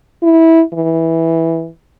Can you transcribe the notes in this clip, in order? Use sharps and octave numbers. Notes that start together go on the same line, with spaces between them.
E4
E3